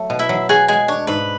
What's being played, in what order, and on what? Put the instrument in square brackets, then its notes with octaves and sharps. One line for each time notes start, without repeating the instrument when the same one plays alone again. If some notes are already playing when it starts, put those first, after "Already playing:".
Already playing: [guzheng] F#3 A3
B2
[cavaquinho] E4 E5
[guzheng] F#3
[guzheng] F#4 [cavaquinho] G#4 G#5
[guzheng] G#3 [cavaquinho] G#4 G#5
[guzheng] D4 [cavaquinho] C#5
[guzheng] G#2 [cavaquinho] B4